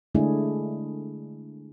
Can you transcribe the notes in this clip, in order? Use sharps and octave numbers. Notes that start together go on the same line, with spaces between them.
D3 G#3 A3 D4 E4 G#4